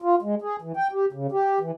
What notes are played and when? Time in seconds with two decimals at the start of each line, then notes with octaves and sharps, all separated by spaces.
0.02 F4
0.22 G#3
0.42 G#4
0.62 E3
0.77 G5
0.92 G4
1.13 C#3
1.32 G4
1.60 E3